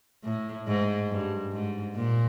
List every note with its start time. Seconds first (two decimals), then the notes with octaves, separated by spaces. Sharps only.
0.24 A2
0.67 G#2
1.09 G2
1.52 G#2
1.96 A#2